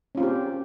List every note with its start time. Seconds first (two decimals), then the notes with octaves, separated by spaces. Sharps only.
0.15 C#4
0.17 F4
0.20 C4
0.23 G4